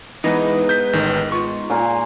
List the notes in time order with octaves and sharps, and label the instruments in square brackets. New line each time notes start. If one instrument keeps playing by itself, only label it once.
[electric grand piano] E3 [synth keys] G#3 B3 D#4 [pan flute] B4
[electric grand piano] G6 B6
A1 D#3
[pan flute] F4 [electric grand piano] C#6
[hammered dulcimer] A#2 F5 G#5